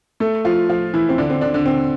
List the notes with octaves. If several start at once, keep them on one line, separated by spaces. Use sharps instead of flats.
A3 A4
F3 F4
F3 F4
E3 E4
C4
D3 D4
C4
D3 D4
D3 D4
C4